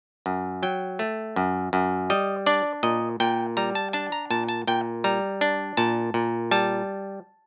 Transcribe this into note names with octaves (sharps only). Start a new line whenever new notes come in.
F#2
F#3 G5
A3
F#2
F#2
G3 D#5
D4 D5
A#2 D#5
A#2 G5
G3 A#5
A5
D4 A5
A#5
A#2 A5
A5
A#2 G5
G3 A#5
D4
A#2 A5
A#2
G3 A5